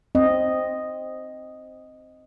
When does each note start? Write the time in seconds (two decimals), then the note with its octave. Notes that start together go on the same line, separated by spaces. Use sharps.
0.15 C4 D#5